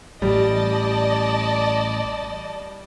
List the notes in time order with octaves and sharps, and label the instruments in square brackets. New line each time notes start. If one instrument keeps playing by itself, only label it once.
[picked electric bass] A1 [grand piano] G3 [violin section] D5 D#5 A5